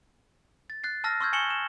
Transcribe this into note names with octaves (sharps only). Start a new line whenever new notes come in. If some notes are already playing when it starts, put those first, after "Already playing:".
A6
F#6 A6 C7
A5 E6 F6 A#6
C6 C#6 E6 F6 G6 G#6
G#5 C#6 C#7 E7 F#7 G7
E7